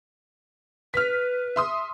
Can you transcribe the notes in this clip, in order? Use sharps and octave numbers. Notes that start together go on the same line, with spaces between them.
B4 F6 B6
E5 C6 D#6